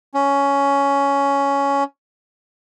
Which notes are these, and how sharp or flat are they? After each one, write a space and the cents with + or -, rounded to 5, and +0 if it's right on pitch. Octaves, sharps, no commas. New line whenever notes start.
C#4 +10